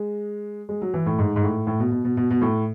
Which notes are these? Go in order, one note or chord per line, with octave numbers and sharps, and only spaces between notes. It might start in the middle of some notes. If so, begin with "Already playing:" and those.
Already playing: G#3
G#3
F#3
E3
A2
G#2
G#2
A2
A2
B2
B2
B2
B2
B2
A2